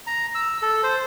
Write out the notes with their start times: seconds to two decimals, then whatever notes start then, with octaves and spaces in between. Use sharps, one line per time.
0.07 A#5
0.35 E6
0.62 A4
0.83 C5